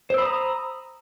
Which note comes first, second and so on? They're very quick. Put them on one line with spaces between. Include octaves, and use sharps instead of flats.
C5 E6 B5 D#6 A#5